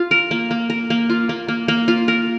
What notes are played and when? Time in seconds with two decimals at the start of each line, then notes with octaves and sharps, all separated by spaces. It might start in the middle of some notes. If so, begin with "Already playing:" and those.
Already playing: F4
0.11 A#4
0.31 A#3
0.51 A#3
0.70 A#4
0.90 A#3
1.10 F4
1.29 A#3
1.48 A#3
1.68 A#3
1.88 F4
2.08 A#4